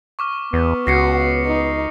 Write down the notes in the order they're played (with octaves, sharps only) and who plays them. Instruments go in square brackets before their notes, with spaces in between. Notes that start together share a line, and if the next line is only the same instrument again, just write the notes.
[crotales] C#6 D6 F6
[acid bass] E2 [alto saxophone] B3
[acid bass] C#2 [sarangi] F#4 [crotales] A#6 C7 C#7
[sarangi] D#4